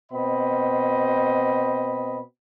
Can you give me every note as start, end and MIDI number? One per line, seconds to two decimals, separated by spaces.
0.12 2.20 47
0.12 2.20 60
0.12 2.20 75
0.12 2.20 83